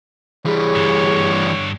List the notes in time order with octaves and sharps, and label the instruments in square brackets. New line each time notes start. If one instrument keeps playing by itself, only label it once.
[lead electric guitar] E3 G3 [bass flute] G#4 [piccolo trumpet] C#5
[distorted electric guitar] G2 D3